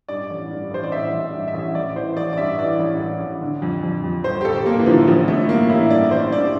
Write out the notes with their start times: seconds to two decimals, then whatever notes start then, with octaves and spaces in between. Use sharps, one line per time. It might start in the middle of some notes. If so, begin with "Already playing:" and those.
0.09 G2 D5
0.30 A1
0.51 G2
0.71 A1 C5
0.84 D5
0.92 A1 E5
1.13 A1
1.20 E5
1.34 G2
1.48 E5
1.54 A1
1.75 A1 D5
1.96 E3 C5
2.17 A1 D5
2.33 D5
2.37 G2 E5
2.58 E3 D5
2.79 A1
3.00 A1
3.20 A1
3.41 D3
3.62 F2
3.83 F2
4.04 F2
4.24 G1 C5
4.41 G4
4.45 G1 A4
4.66 G1 A#3
4.80 E3
4.86 D3 F3
5.08 A1 F3
5.28 A1 A3
5.48 G2 A#3
5.70 A1 E4
5.90 G2 D5
6.11 A1 C5
6.32 G2 D5